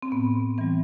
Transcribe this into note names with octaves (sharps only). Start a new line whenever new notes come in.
C4
A2 B3
E3 G3 C4